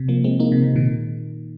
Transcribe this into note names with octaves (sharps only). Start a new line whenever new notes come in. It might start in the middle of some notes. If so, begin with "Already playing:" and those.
Already playing: C3
F3 A#3
G#3 C4
A#3 D#4
C3
C3
A#2 D#3